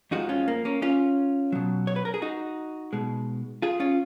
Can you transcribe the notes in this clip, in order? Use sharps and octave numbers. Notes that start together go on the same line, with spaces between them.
F2 F3 G#3 D#4 F#4
C#4 F4
A#3
A#3 C#4
C#4 F4
B2 F#3
C#5
B4
A#4
G#4
D#4 F#4
B2 G#3
F4 G#4
C#4 F4